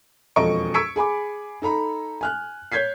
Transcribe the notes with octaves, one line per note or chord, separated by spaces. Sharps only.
E1 F2 A4 D#5 C#6 D7
C#6 E6 G#6 B6 C#7 D7
G#4 G#5 B5 D6
D#4 A4 A#5 B5
G#5 F6 F#6
C#5 G6 G#6 B6 C7